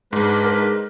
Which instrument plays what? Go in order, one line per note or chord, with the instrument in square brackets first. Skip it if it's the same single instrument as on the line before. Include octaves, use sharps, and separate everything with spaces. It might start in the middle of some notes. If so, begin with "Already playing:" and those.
[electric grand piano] G#2 [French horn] G#3 [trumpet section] D4 B4
[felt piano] A#4